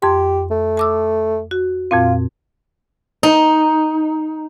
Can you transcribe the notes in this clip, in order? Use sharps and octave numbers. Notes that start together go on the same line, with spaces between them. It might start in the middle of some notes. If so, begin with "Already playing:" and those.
F2 G4 C6
A3
A5 D6 E6
F#4
F2 A#2 C4 F4
D#4